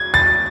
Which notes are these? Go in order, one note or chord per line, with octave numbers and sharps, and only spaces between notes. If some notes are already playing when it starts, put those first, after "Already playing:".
Already playing: G#6
A6